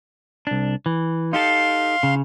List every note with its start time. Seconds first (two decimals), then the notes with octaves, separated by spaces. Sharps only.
0.47 C2 D4
0.86 E3
1.33 D#4 G4 A4 F5 C6
2.03 C#3